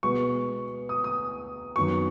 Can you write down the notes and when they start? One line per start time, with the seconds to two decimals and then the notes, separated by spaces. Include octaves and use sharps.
0.03 B2 G#3 B3 C#6
0.89 D#6
1.04 D#6
1.76 F#2 D#3 F#3 B3 C#6